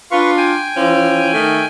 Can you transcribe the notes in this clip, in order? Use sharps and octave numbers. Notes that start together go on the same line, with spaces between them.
D4 F4 B4 C#6
G5 G#5
E3 F3 C#4
D#3 A3